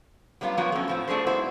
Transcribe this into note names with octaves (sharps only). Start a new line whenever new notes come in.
F#3 G3 B3 D#4 F4
F3 F#3 A#3 B3 F#4
F#2 A3
A2 F3 C4
A3 D4 G#4 A4 C5
G#2 B3 E4 F#4 C5